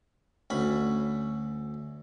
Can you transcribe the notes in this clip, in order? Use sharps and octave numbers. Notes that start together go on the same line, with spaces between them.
D2 C#4 B5